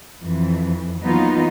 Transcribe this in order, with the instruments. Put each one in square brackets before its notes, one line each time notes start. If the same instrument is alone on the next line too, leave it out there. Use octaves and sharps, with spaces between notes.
[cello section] F2 E3
E3 F#3 A#3 B3 D#4 F4